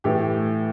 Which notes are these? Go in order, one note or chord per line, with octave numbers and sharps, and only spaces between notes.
A2 E3 A3 G4